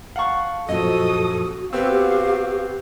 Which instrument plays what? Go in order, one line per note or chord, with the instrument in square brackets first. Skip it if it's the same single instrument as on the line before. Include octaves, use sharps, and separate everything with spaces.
[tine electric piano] F5 A5 [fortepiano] F#5 C#6
[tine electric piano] F#2 A#2 F3 [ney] F#4 [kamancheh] A4 D#6 [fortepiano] D#5
[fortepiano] B3 C4 [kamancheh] F#4 F5 [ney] G4 [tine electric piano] E6